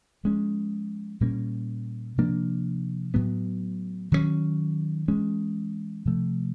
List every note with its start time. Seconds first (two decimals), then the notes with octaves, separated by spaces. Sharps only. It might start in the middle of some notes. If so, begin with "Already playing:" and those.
0.24 F3 G#3 C#4
1.21 A#2 G3 A#3 C#4
2.18 C3 F3 A#3 D4
3.14 A2 F#3 B3
4.12 D#3 F#3 A3 C#4
5.08 E3 G#3 C#4
6.05 C3 F3 A3